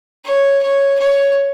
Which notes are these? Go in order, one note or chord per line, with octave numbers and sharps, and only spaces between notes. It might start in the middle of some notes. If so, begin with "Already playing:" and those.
C#5
C#5
C#5